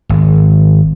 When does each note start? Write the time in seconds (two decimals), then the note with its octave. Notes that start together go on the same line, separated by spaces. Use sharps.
0.09 G#1